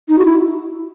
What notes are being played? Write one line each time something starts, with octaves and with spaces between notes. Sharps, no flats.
D#4
F#4
E4